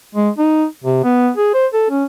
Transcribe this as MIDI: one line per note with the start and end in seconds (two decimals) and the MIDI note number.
0.15 0.30 56
0.38 0.66 63
0.84 0.99 48
1.04 1.30 59
1.37 1.53 68
1.54 1.67 72
1.73 1.86 69
1.90 2.04 61